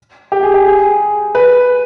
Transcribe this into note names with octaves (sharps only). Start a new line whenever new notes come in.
G4
G#4
G4
G#4
B4